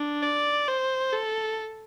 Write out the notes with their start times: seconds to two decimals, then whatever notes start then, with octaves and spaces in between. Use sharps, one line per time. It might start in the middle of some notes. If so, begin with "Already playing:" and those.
Already playing: D4
0.23 D5
0.69 C5
1.13 A4